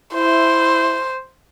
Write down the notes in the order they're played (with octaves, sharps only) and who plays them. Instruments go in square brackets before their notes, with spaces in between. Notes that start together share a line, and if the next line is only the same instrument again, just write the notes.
[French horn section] E4 [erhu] C5